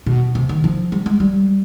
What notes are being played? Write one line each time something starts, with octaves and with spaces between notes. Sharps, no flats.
B2
C3
D#3
F3
G3
G#3
G3